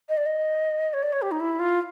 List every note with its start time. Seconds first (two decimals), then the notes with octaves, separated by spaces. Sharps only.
0.09 D#5
0.17 D5
0.26 D#5
0.94 C#5
1.03 D5
1.12 C#5
1.22 G4
1.31 D#4
1.40 E4
1.59 F4